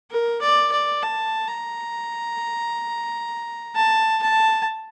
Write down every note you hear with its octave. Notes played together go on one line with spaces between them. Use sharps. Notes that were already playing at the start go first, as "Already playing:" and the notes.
A#4
D5
D5
A5
A#5
A5
A5